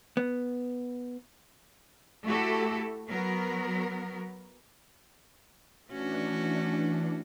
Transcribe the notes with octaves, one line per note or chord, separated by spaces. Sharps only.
B3
A3 E4 F#4 G4 A4
F#3 B3 A#4
E3 A3 C#4 D4 F#4